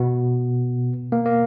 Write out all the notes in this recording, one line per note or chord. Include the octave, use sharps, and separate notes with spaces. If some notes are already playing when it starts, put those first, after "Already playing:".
Already playing: B2 B3
A#3
A#3